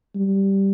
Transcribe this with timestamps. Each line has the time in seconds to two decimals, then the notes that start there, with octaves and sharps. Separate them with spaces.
0.15 G3